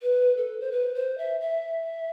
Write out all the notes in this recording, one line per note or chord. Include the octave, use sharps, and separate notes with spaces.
B4
A4
C5
B4
C5
E5
E5